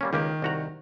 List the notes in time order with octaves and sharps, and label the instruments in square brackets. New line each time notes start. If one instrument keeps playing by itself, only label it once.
[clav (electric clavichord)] G3 A#3 C#4
[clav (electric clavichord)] C#2 A#3 G4 [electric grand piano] D#3
[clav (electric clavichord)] C2 F#4 A#5